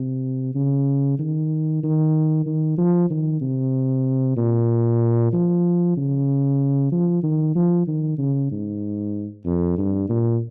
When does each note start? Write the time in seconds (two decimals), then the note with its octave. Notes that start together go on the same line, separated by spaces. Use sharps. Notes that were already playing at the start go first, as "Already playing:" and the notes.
Already playing: C3
0.55 C#3
1.19 D#3
1.83 D#3
2.46 D#3
2.78 F3
3.10 D#3
3.41 C3
4.37 A#2
5.33 F3
5.97 C#3
6.92 F3
7.23 D#3
7.55 F3
7.87 D#3
8.18 C#3
8.51 G#2
9.45 F2
9.78 G2
10.09 A#2